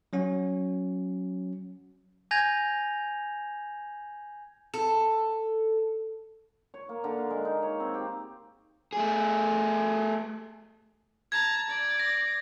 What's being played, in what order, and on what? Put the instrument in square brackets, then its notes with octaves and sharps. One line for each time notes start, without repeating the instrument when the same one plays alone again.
[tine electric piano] F#3 C#4 F#4
[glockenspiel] G#5 G6 G#6 A#6 F7
[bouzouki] A4
[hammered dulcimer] C#5
A#3
D3
F5
G#3
D#4
C#5
C4
G4
[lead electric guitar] A3 G#4
[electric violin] A5 A#5 [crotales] G#6
[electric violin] D5
[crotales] A#6